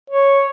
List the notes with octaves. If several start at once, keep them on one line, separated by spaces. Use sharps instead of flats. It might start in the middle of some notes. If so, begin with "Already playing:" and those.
C#5